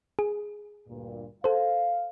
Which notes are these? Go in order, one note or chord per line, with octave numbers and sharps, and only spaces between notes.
G#4
D2 G2 A#2
A4 C5 F5